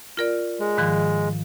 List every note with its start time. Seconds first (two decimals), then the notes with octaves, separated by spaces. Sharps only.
0.17 F4 A#4 D5
0.60 G#3
0.78 G#2 D#3 F3